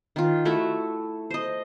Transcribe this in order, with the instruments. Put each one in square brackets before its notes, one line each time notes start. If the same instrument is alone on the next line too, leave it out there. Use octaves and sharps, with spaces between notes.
[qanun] D#3 F4
A3 E4 F#4 E5
C5 D#5